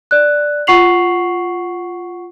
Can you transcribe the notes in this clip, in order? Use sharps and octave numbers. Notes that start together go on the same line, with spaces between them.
D5 F#6
F4 F#5 C#6 C7 F7 F#7